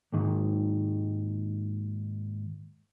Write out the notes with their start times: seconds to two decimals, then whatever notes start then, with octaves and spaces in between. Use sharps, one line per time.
0.13 D#2 G#2 D#3